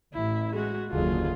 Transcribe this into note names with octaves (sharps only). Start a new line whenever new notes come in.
A1 E4
G#3 F#4
F#1 D#2 D3 F4 G#4